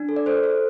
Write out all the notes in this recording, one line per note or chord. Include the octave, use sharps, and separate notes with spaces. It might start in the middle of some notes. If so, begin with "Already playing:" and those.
Already playing: D4
A4
D5
A4 C5
A4